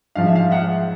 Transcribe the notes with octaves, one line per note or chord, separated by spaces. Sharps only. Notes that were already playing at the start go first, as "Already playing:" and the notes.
G#2 F3 F5
E5
F5
E5 F#5